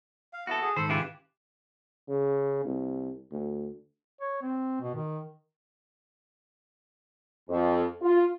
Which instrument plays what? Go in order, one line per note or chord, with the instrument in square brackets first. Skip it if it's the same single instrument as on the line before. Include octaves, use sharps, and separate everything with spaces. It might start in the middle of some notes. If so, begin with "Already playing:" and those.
[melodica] F5
[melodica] B3 E4 [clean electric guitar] F#4 A4
[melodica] G#4
[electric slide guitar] G#2 D#3 [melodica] A4 B5 [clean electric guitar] C5
[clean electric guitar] C#3 E4 F4 [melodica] G4 B4
[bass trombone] C#3
C2
D2
[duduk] C#5
C4
B2
D#3
[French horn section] F2
F4